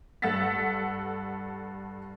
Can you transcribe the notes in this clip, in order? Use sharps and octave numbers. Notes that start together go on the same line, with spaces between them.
G2 A4 F#5 E6 A6 B6